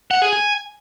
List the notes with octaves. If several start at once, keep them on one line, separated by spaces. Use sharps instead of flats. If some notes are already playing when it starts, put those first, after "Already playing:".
F#5
G#4
G#5